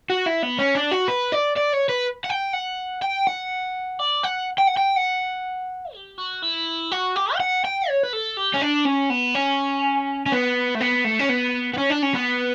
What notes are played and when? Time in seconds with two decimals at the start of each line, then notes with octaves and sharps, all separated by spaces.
0.10 F#4
0.26 E4
0.43 B3
0.59 C#4
0.75 D4
0.91 F#4
1.08 B4
1.32 D5
1.56 D5
1.73 C#5
1.89 B4
2.24 F#5
2.29 G5
2.53 F#5
3.02 G5
3.27 F#5
3.99 D5
4.24 F#5
4.58 G5
4.67 F#5
4.77 G5
4.97 F#5
5.94 G4
6.18 F#4
6.42 E4
6.92 F#4
7.16 G4
7.35 G5
7.40 F#5
7.65 G5
7.89 C#5
8.03 B4
8.13 A4
8.37 G4
8.54 C#4
8.62 D4
8.85 C#4
9.10 B3
9.35 C#4
10.26 C#4
10.32 B3
10.75 A3
10.81 B3
11.04 A3
11.19 C#4
11.29 B3
11.74 B3
11.78 C#4
11.90 D4
12.02 C#4
12.14 B3